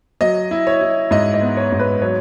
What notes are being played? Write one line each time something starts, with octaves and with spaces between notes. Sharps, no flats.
F#3 D#5
E4
C#5
E4
G#2 D#5
D#5
B3
C#5
G#2
B4
F#3 C#5